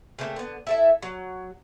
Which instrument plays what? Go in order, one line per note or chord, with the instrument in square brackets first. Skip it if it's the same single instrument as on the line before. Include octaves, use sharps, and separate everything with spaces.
[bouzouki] C#3 A3 A#3 C4
D3 B3
E4 A4 E5
F#3